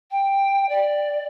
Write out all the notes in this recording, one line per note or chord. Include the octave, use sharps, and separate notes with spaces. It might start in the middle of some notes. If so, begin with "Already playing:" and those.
G5
D5